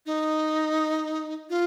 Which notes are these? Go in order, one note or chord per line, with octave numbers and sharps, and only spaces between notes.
D#4
F4